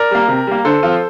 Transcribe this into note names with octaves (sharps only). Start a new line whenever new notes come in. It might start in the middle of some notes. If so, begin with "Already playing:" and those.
Already playing: A#4 D5
G3 A#3
C3
G3 A#3
D3 A4 C5
F3 C4 F4